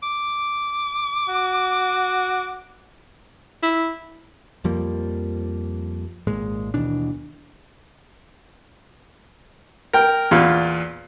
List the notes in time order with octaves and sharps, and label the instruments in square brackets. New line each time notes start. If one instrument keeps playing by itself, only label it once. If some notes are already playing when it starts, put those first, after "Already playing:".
[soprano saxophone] D6
[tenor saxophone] F#4
E4
[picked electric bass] F2 F3 G3 A#3
G#1 A#2 G#3
D#2 B2 E3 D4
[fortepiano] A#4 G5
E2 A#2 F4